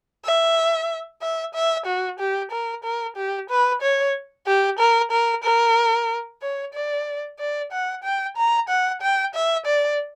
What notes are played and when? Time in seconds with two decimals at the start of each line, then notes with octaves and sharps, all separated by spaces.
0.25 E5
1.21 E5
1.54 E5
1.86 F#4
2.19 G4
2.51 A#4
2.84 A#4
3.16 G4
3.49 B4
3.81 C#5
4.46 G4
4.79 A#4
5.11 A#4
5.43 A#4
6.42 C#5
6.73 D5
7.39 D5
7.72 F#5
8.03 G5
8.37 A#5
8.69 F#5
9.02 G5
9.34 E5
9.66 D5